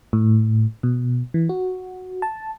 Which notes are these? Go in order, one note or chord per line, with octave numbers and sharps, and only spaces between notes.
A2
B2
E3
F#4
A5